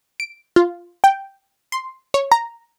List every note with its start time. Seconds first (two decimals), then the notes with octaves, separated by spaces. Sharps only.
0.20 D7
0.56 F4
1.04 G5
1.72 C6
2.14 C#5
2.32 A#5